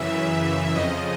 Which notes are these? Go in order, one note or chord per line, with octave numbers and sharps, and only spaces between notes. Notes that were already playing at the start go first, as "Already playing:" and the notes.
Already playing: F#2 C#3 E3 E5
F2 C#3 F3 D#5